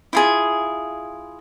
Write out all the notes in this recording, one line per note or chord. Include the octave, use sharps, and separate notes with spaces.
E4 F4 G#4